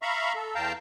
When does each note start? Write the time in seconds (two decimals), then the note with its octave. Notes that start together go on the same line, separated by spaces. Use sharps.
0.02 E5 F5 A#5 B5 C#6
0.35 A4
0.55 E2 F5 G5 A5 A#5